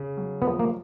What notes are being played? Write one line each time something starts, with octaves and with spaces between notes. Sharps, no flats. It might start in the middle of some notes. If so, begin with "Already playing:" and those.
Already playing: C#3
F#3
F3 B3
A#3